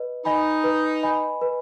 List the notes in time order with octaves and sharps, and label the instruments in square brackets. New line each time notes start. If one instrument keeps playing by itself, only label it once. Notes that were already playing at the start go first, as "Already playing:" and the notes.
Already playing: [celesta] B4 D#5
[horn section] D#4 [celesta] D#5 G#5 B5
[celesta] B4
D#5 G#5 B5
B4